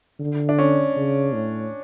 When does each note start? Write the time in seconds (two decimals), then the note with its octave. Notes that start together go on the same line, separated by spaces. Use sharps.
0.20 D3
0.49 D4
0.59 C#4
0.96 C#3
1.34 A2